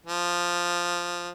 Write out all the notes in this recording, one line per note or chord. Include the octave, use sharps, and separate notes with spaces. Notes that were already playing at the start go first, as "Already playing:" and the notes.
F3